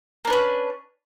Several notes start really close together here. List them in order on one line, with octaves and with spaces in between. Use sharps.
A#3 D4 B4 C#4